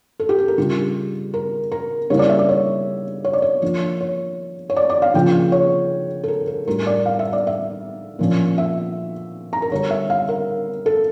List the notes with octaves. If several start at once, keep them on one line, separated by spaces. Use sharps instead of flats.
A4
G4
A4
A#4
C#3 G3 D4 F4 G4
A#4
A#4
C#3 G3 A#3 E4 C#5
D5
E5
D5
C#5
C#5
D5
C#5
F3 A#3 D4 F4
C#5
C#5
D5
D5
F5
C#3 F3 A#3 D4 F4 G5
C#5
A4
A#4
A4
A2 G3 D4 A#4
D5
F5
E5
D5
E5
A#2 F3 C#4
E5
A#5
A#4
D3 G3 D4 C#5
E5
F5
A#4
A4